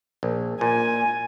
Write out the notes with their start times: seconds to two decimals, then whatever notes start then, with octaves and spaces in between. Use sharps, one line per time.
0.23 A#1
0.61 A#2 G#5